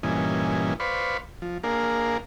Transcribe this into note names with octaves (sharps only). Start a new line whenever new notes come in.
G2 A#2 E3 C#4 D#5 G#5
B4 C5 D5 F5 B5 C#6
F3
A#3 D4 G#4 A#4 F5